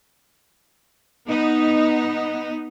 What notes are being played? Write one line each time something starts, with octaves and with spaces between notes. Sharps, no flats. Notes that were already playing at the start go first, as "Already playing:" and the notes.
B3 D#4